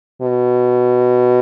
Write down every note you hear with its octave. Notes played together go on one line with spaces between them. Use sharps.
B2